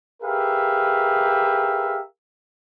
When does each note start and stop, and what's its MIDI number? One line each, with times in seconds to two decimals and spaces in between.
0.23 2.00 67
0.23 2.00 68
0.23 2.00 70
0.23 2.00 71
0.23 2.00 76
0.23 2.00 77